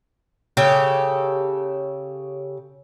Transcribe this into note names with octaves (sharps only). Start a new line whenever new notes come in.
C#3 G4 A4